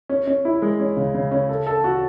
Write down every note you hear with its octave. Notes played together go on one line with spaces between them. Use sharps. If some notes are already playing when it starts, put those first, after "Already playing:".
C#4
C#4
E4
G#3
C#4
C#3
C#3
C#4
A4
A4
F#4